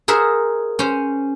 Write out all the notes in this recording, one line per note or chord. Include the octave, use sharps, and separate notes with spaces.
G#4 A#4 C5 E5 F#5
C#4 C5